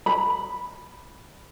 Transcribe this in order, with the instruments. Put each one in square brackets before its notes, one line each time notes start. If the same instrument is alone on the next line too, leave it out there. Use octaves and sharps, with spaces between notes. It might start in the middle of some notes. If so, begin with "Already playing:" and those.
[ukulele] B5